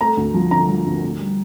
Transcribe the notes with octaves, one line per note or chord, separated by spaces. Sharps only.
A3 A#5
D2
F3
D3 A#5
F3
D2
D2
G3